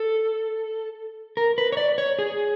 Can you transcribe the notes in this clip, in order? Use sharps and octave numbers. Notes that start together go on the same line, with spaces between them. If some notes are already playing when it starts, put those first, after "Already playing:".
Already playing: A4
A#4
B4
C#5
D5
C#5
G#4